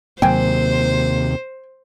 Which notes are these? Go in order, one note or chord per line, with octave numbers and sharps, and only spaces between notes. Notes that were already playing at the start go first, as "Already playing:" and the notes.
D#2 C3 F#3 A#3 C5 G5 G#5